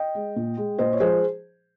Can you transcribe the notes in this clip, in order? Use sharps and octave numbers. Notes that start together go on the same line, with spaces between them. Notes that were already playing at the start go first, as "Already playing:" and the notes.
Already playing: D#5 G5
G#3
A#2
G#3
A#2 C5 D#5
C#5
F3 G#3 G#4 C5